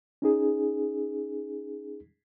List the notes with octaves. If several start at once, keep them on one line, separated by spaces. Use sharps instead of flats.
C#4 D#4 G#4